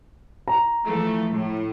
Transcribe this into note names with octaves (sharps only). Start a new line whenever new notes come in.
A#5
E3 F3 A3
A2